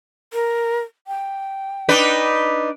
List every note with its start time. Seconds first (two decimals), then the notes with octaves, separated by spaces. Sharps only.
0.33 A#4
1.07 G5
1.89 D4 D#4 B4